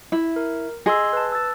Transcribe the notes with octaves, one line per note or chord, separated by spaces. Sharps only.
E4
A#4
G#4 D#5 C6 E6
B4 A5
E6 A6